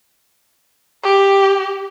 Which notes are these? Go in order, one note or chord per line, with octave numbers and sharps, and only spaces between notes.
G4